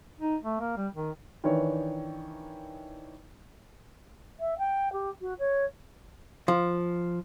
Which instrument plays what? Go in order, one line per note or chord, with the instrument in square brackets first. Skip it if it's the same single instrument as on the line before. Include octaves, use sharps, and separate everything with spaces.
[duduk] D#4
A3
A#3
G3
D#3
[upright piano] D#3 E3 D4 C#5
[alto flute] E5
G5
G4
F#4
C#5
[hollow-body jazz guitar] F3